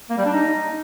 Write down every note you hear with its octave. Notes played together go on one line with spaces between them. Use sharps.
A#3
G3
D4
D#4